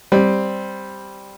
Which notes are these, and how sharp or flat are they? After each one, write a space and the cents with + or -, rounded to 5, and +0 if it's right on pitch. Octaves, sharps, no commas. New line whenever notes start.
G3 +0 C4 +0